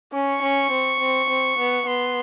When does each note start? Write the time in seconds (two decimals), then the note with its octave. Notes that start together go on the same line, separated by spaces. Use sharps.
0.13 C#4 C#6
0.42 C#4
0.72 C4
1.00 C4
1.30 C4
1.58 B3
1.87 B3 C6